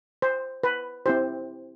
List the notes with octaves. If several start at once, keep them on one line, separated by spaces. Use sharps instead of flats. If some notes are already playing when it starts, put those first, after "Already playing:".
C5
B4
C4 E4 G4 C5